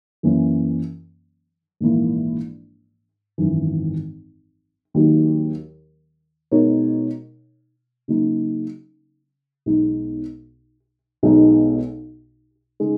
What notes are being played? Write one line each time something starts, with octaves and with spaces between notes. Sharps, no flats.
F#2 E3 A#3 C#4
A#1 G#2 E3 A#3 E4
G#1 F#2 E3
D#2 D#3 F#3 A#3
B2 G#3 D#4 A#4 C#5
C#3 F#3 A#3 D#4
B1 B2 G#3 D#4
B1 B2 G#3 D#4
C#3 G#3 D#4